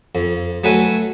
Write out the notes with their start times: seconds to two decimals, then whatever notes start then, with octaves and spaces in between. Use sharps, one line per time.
0.15 F2
0.64 F#3 A3 B4 G#5